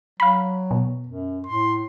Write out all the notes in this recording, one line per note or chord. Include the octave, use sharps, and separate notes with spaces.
F#3 F5 B5
B2
F#2
A2 C6